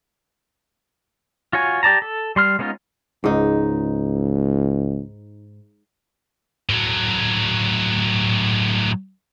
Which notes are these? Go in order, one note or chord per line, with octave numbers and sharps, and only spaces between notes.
F4 F#4 C#5 G#5
G4 D5 A5 A#5
A4
G3 C6 F6
G#3 B3 C#4 D#4 F4
C#2 G#2 D#4
A2 F#3